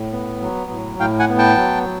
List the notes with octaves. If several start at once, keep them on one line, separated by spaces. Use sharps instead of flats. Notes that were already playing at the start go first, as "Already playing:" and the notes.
Already playing: A2
B3
F#3
A2
A2 F5 G5
F#5 G#5
B3
G5 A5
F#3